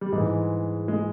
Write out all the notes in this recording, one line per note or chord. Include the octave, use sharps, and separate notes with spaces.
G3
G#2 E3 G#3
G#3